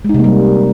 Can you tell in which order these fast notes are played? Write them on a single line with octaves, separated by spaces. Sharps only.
G#3 D#4 C3 A#3 G3